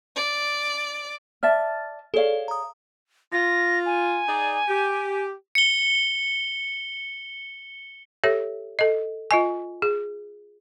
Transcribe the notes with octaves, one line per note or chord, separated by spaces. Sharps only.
D5
D5 E5 A5 F6 A6
G#4 A4 C#5 D5 F5
A#5 D#6
F4 A#6
G#5
D#4 G#4 D5
G4
C#7 G7
G4 A4 C#5 E5
A4 D#5
F4 D#5 G#5
G#4